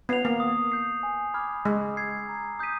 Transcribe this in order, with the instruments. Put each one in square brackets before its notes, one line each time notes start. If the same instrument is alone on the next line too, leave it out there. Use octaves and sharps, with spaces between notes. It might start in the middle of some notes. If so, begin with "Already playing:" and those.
[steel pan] B3 [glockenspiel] C7 F7
[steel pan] A#3
[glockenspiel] D#6
G6 C7
G#5
B5 D6 F6 G#6
[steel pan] G#3 [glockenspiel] E6
[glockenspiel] G#6 C7
A#5
D#6 G6 B6 D#7